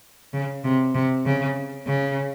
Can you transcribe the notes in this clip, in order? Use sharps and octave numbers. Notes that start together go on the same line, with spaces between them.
C#3
C3
C3
C#3
C#3